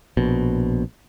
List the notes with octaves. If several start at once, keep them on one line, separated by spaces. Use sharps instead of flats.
A#1 B2